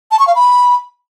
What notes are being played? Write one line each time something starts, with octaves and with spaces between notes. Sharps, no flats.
A5
C#6
F5
B5